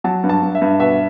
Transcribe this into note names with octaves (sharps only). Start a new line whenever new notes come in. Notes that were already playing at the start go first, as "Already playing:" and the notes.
F#3 A5
G2
A5
G2
E5
G2
B2 E5